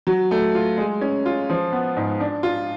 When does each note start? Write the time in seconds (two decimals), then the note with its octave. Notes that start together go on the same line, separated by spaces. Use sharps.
0.07 F#3
0.31 A3
0.55 F4
0.77 G#3
1.01 C#4
1.26 F4
1.50 F3
1.72 B3
1.96 G#2
2.20 D4
2.43 F4